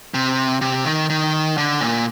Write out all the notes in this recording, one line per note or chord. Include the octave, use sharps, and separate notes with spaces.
C3
C3
D#3
D#3
D3
A#2